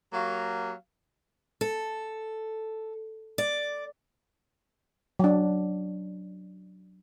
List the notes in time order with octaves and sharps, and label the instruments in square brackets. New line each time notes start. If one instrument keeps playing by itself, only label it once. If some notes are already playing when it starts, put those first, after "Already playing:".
[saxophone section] F#3 A#3 F#4 G4 F5
[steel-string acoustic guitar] A4
D5
[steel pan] F#3 D4